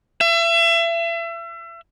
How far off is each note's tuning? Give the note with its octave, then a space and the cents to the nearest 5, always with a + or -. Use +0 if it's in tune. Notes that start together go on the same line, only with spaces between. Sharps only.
E5 +35